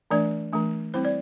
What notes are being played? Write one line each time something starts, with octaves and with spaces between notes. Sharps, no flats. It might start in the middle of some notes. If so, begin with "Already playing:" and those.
E3 A3 D4 D5
E3 A3 D4
G3 C4 E4 C5
D5